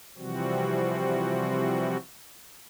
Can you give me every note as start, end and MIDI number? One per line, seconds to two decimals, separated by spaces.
0.18 1.97 48
0.18 1.97 52
0.18 1.97 53
0.18 1.97 55
0.18 1.97 60
0.18 1.97 66